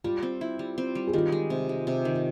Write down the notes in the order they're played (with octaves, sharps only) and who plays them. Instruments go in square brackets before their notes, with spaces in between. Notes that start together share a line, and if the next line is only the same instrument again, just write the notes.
[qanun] G3 [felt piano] F4
[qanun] C4
E4
G3
C4
G3
[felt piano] G#4
[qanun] D#3 [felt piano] F4 G4
[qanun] G#3
C3
G#3
C3
D#3